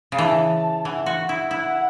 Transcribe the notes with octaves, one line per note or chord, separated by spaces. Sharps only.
C#3
E3 A5
E3 F#5
F#4
E4
E4 F#5